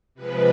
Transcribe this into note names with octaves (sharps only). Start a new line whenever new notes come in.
C3 F3 G#3 B4